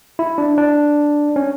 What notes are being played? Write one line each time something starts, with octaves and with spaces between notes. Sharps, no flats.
E4
D4
D4
C#4